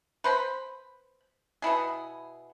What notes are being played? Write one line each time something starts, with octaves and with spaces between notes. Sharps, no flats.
B4 C5 A#5 B5
B2 B3 E4 G#4